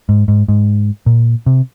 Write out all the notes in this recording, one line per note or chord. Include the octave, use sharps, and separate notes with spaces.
G#2
G#2
G#2
A#2
C3